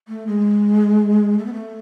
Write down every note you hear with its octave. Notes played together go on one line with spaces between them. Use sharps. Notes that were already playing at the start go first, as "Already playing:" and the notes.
A3
G#3
A3
B3
A3